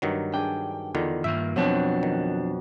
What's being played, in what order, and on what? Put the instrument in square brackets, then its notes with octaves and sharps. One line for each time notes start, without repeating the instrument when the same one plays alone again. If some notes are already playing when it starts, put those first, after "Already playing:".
[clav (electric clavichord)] G2 D#3 F#3
[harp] D4 G#4 [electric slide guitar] G5
[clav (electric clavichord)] E2 D3 D#3 [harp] F4
[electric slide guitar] G2 D#3 A#3 [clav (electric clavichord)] E5
[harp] F2 B2 F#3 [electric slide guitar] F3 D4
[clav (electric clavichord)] D#3